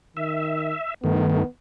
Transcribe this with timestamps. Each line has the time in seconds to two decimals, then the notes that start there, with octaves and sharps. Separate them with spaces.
0.17 D#3 E5
1.04 G2 D#3 A3 B3